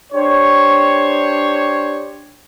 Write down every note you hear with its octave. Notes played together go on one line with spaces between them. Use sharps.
D4 G4 C5 C#5